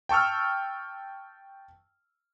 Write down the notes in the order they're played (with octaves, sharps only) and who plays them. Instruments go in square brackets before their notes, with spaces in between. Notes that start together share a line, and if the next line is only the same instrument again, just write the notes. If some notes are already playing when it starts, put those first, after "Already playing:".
[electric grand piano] G5 A5 C#6 E6 F6